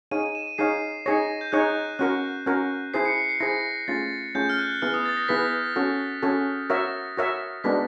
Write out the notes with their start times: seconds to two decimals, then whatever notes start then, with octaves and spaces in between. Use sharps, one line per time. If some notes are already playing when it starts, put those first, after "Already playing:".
0.11 D#4 G#4 C#5 F5 D#7
0.24 D#7
0.35 E7
0.47 D#7
0.58 D#4 G#4 C#5 F5 C7
1.06 D#4 G#4 C#5 A#6
1.41 G6
1.52 D#4 G#4 C#5 F#6
1.99 C#4 F#4 A#4 F#6
2.46 C#4 F#4 A#4
2.94 E4 G#4 C5 C7
3.05 C#7
3.18 C#7
3.29 C7
3.40 E4 G#4 C5 A#6
3.88 A3 C#4 F4 G#4 A6
4.35 A3 C#4 F4 G#4 G6
4.49 F6
4.58 F#6
4.82 B3 E4 G#4 B4 F6
4.94 D#6
5.06 A6
5.17 A#6
5.28 B3 E4 G#4 B4 B6
5.76 C#4 F#4 A4
6.23 C#4 F#4 A4
6.70 F#4 A#4 C#5 E5 A#6
7.17 F#4 A#4 C#5 E5
7.64 G#3 B3 D4 F#4 A#4 B6